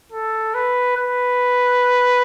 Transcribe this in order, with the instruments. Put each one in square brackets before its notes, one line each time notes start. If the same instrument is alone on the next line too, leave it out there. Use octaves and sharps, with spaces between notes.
[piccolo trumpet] A4
B4
B4